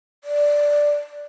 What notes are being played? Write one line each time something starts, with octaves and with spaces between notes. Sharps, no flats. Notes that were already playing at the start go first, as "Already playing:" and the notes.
D5